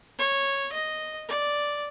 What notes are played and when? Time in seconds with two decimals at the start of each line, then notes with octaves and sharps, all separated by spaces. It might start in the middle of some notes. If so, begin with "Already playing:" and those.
0.18 C#5
0.72 D#5
1.28 D5